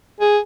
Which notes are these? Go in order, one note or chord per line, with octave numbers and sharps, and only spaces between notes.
G#4